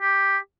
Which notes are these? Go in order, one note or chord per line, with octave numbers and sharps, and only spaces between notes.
G4